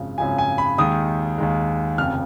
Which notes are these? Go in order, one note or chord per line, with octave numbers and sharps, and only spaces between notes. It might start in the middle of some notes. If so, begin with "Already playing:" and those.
Already playing: G#1 F#2 C#3 F3
G#1 F#2 C#3 F3 G#5
G#5
B5
D#2 D#3 G#3 D#6
D#2 D#3 G#3
F1 F2 C#3 F6